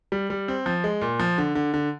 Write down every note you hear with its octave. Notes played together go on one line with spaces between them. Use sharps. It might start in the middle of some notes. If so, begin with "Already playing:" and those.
G3
G3
C4
F3
G#3
A#2
F3
D3
D3
D3